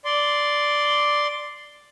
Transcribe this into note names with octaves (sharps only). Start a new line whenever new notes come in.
D5 C6